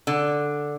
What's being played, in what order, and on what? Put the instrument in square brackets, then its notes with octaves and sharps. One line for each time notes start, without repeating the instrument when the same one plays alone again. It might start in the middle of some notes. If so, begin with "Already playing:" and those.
[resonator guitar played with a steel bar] D3